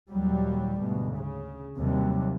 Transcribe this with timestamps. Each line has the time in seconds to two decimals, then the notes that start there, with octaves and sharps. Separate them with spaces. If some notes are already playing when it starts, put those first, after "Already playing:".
0.11 D#2 A#2 F#3 G3
0.81 D2 G#2 B2
1.18 C#3
1.78 D#2 C3 F#3 G3